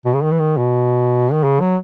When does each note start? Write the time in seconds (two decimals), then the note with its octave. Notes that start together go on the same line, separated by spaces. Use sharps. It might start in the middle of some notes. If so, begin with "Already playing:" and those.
0.06 B2
0.14 C#3
0.23 D#3
0.31 E3
0.39 D#3
0.57 B2
1.33 D#3
1.44 C#3
1.61 F#3